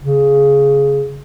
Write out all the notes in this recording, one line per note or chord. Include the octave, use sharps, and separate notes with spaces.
C#3